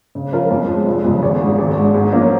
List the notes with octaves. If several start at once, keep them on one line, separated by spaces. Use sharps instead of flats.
C#3
F3 C#4 F4 A#4
F2
F3 G#3
F1
F2 C#3 G#3
G#1
G#2 G#3
G#1
G#2 G#3
G#2
F3 A#3 C#4